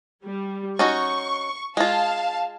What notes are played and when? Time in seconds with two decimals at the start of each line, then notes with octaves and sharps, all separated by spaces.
0.24 G3
0.79 C#4 D#4 F#4 C#6
1.77 G#3 F4 F5 A5